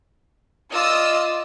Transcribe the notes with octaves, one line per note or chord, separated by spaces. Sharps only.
F4 D5 D#5 D#6 E6